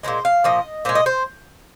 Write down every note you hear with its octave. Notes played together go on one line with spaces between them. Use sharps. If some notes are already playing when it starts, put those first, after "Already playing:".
A#2 F3 G#3 C5
F5
A#2 F3 D#5
A#2 G#3 C5
D#5
C5